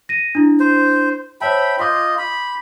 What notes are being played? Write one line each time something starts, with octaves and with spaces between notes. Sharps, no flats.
A#6 D#7
D4 E4
C5
C5 C#5 E5 G5 A5 B5
F4 D#5 C6 D6 G6
B5